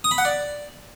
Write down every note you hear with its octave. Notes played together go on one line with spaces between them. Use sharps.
D#6
B5
F#5
D5